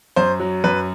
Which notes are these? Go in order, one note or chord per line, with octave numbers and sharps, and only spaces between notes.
F#2 C5
F#3
F#2 B4